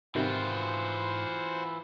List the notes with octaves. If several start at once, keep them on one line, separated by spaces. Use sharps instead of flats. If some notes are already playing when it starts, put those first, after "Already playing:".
G#2 C3 D#3 E3 G3 F4 F#4 C5